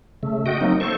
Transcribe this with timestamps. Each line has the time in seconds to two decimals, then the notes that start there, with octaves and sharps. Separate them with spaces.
0.23 C#3 A3
0.46 F#4 D#5 G5
0.61 F#3 A#3 C4 D#4
0.80 A4 C5 C#6